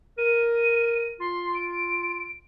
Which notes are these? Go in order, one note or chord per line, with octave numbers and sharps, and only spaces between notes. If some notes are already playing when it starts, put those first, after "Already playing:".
A#4 D#7
F4 C6
D7